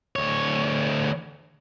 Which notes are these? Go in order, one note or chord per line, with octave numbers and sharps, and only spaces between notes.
D2 C#5